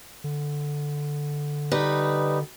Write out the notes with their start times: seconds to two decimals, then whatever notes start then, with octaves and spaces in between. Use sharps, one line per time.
0.24 D3
1.71 G3 D#4 B4